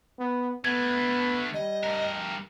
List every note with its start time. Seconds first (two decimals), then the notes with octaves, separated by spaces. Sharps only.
0.19 B3
0.65 D3 A3 B3 G#6
1.54 G3 D#5
1.83 G2 A#4